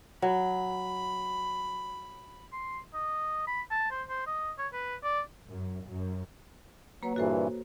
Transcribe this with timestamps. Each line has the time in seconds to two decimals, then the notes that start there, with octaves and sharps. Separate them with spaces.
0.22 F#3 B5
2.53 C6
2.94 D#5
3.47 B5
3.71 A5
3.91 C5
4.09 C5
4.27 D#5
4.58 C#5
4.73 B4
5.03 D5
5.48 F#2
5.87 F#2
7.03 F#3 A#3 B4 C#5
7.16 G2 A#2 E3 F#4 A4 C5